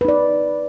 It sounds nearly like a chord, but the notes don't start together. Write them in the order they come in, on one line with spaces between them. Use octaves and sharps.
B4 D#4 D5